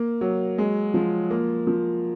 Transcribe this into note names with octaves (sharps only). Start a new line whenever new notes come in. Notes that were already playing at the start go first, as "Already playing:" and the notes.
Already playing: A#3
F#3
G#3
F3
A#3
F3